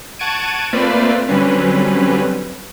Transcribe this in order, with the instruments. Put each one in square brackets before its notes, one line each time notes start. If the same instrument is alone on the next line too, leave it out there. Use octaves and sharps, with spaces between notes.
[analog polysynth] F#5 A5 C#6 G#6 D7 D#7
A3 A#3 C4 F4 B4 D5
D3 F#3 G3 C4 C#4 B4